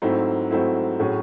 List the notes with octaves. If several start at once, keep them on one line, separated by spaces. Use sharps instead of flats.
G#2 F#3 A3 C4 E4
G#2 F#3 A3 C4 E4
A2 F#3 C#4 G#4